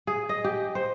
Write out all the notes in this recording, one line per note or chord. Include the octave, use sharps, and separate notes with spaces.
G#4
D#5
G4
C5